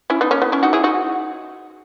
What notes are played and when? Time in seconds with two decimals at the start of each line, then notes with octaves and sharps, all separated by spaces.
0.10 C#4 E4
0.21 B3 D#4
0.31 A#3 C#4
0.42 B3
0.52 C#4 E4
0.63 D#4 F#4
0.73 E4 G#4
0.84 D#4 F#4